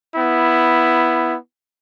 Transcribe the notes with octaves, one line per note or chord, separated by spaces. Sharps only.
B3 E4